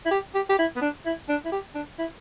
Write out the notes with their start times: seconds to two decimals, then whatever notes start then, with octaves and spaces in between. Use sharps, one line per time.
0.05 E4
0.11 G4
0.35 G4
0.49 G4
0.59 E4
0.76 B3
0.81 D4
1.05 E4
1.29 D4
1.45 E4
1.52 G4
1.75 D4
1.98 E4